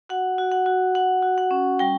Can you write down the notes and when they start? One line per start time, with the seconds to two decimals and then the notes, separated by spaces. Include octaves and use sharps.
0.09 F#4 F#5
0.38 F#4
0.52 F#5
0.66 F#4
0.95 F#4 F#5
1.22 F#4
1.38 F#5
1.51 C#4
1.79 G3 G5